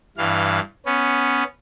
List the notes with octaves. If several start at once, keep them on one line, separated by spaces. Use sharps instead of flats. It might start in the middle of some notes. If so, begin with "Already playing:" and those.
G2 E3 F5
B3 C#4